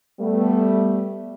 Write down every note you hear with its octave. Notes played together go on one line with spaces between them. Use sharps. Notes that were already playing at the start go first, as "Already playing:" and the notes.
G3 A3 B3